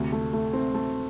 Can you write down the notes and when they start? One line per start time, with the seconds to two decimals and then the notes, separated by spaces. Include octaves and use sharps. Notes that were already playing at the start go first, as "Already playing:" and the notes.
Already playing: D2 C3
0.12 A3
0.33 A3
0.53 C4
0.74 A3